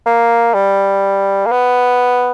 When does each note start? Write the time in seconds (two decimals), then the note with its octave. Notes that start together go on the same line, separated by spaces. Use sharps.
0.06 A#3
0.54 G3
1.46 A#3
1.51 B3